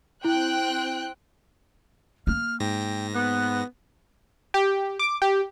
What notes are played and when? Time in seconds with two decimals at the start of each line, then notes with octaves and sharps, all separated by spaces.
0.25 C4 E4 G5 F#6
2.27 A#3 F6
2.60 G#2 G5 A#6
3.14 B3 F#6
4.54 G4
4.99 D6
5.22 G4